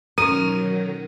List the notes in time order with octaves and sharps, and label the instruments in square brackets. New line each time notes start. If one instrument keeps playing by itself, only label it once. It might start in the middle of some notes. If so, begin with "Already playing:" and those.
[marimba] B2 C#4 [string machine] D#3 F#3 [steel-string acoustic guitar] A#4 [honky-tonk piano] D#7